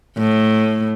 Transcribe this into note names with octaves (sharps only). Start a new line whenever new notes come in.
A2